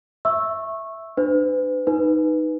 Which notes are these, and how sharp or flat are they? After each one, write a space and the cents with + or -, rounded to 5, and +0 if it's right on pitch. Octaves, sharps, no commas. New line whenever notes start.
E5 +0 C#6 -15 E6 +0
D4 +30 B4 +40
D#4 +0 B4 +0